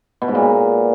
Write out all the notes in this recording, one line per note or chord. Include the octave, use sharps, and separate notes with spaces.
B2
G#2
A#2